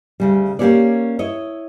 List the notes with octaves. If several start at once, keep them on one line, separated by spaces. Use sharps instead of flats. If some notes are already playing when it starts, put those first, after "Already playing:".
D2 C#3 G3
A#3 C#4 F4 G4 C#5 D5
E4 C#5 D#5